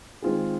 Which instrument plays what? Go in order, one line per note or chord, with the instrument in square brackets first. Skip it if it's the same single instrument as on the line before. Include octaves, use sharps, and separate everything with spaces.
[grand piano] D#3 G#3 C4 F4 G#4